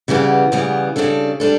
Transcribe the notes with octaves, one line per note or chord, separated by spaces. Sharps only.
C#3 E3 G3 B3
C#3 E3 G3 B3
C#3 G3 D4 A4
G3 D4 A4